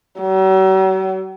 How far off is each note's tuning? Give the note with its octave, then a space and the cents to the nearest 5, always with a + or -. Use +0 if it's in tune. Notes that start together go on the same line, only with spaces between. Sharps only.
F#3 +45